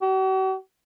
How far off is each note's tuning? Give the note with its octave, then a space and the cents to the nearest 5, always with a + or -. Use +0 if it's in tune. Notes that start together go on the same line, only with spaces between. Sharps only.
F#4 +45